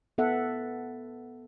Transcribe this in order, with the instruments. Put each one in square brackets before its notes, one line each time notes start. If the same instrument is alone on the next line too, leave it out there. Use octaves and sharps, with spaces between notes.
[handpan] B3 A4 E5 F#5